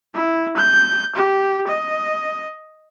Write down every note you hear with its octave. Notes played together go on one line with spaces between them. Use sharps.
E4
G6
G4
D#5